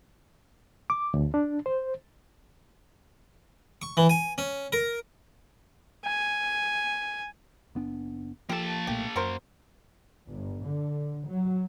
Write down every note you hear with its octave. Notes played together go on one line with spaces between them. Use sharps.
D6
D2
D4
C5
C#6
E3
G#5
C#4
A#4
G#5
F#1 B3 D4
F3 A#3 G4 A4 A5
B1 A#2 A3 G4
F#2 F#4 A#4 C5
G1
D3
F#3